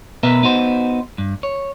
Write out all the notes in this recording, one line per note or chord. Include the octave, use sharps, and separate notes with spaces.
B2 B3 A#4 B4 E5
B3 D#4 F#4 C5
G2
C#5